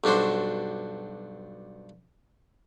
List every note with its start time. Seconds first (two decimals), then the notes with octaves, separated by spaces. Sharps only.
0.04 B1 G2 D4 F#4 C5